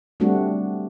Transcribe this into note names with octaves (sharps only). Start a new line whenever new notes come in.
G3 A3 C4 D4 F#4